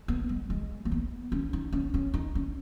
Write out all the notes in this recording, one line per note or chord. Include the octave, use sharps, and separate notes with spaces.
B3
G#3
G#3
A#3
B3
C#4
D#4
C#4
C#4
D#4
C#4